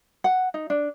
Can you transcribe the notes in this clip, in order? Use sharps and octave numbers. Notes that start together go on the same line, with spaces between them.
F#5
D#4
D4